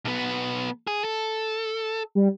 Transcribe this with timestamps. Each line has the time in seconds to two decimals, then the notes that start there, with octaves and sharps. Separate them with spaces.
0.05 B1 B3
0.87 G#4
1.04 A4
2.15 G3